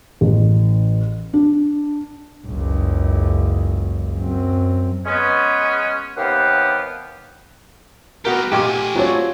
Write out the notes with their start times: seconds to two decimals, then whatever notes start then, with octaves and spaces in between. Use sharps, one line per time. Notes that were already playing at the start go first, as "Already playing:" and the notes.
0.21 A1
1.33 D4
2.47 F#1 C#2
4.17 F#2 C4
5.06 G#3 B3 C#4
6.17 D#2 C3 B3 G4 F5 F#5
8.25 G#3 B3 F#4 G4 A#4
8.52 B1 A#2 A3 G4 G#5 D6
8.95 F#3 C4 D4 F4 C#5